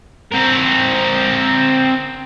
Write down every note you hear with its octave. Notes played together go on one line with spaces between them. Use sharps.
C4 A#4